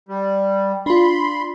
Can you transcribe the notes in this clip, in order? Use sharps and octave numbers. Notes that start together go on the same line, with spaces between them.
G3
D4 F4 B5 C6